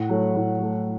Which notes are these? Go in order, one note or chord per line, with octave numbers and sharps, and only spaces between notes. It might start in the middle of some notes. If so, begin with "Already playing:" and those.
Already playing: A2 F#5
F#3 A3
A2
F#3 A3